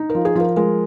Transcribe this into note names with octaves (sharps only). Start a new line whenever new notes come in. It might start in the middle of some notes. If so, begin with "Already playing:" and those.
Already playing: D#4
A#4
F3
G#4
F3 A#4
G#3 A#4